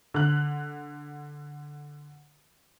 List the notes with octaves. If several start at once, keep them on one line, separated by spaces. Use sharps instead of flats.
D3 F#6